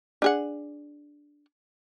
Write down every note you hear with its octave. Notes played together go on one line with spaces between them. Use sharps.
D4 G#4 F#5